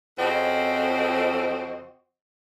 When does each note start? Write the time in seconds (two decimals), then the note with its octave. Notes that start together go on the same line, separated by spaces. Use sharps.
0.19 F2 C#3 C4 F#4 C5 D#5